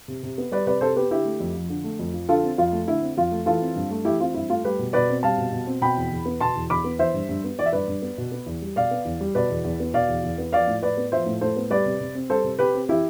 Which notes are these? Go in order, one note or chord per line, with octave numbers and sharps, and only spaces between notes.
C3
C3
B3
G3 B4 D5
C3 B4 D5
C3 A4 C5
B3 G4 B4
D3 E4 G4
A3
F2
F3
D3
A3
F2
F3
D3 F4 A4
C4
F2 F4
A3
D3 E4
C4
F2 F4
A3
E3 F4 A4
C4
G2
A3
E3 E4 G4
C4 F4
G2 E4
A3 F4
G3 G4 B4
B2
B2 B4 D5
C4
G3 F5 A5
B2
B2
C4
B2 G5 B5
E2
E2
B3
B2 A5 C6
E2
E2 B5 D6
B3
E3 C5 E5
G2
G2
B3
E3 D5
E5
G2 B4 D5
G2
B3
B2
B3
E2
G3
B2 D5 F5
B3
E2
G3
B2 B4 D5
E2
E2
B3
B2 D5 F5
E2
E2
B3
F3 D5 F5
A2
A2 B4 D5
B3
F3 C5 E5
A2
A2 A4 C5
B3
G3 B4 D5
C3
C3
C4
G3 A4 C5
C3
C3 G4 B4
C4
E3 E4 G4